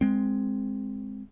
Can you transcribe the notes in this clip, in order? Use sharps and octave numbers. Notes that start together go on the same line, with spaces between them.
G#3 C4